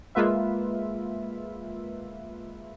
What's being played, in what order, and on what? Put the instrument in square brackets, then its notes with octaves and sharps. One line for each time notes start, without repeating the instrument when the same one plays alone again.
[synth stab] G#3 A#3 F4 B4 E5